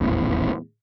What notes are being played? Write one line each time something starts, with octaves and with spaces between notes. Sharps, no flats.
D#1 A1 E2